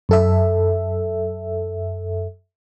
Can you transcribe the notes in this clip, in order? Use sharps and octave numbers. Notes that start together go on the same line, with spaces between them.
F#2 A4 E5